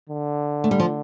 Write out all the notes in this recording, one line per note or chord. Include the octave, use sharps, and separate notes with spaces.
D3
A3
G3
F3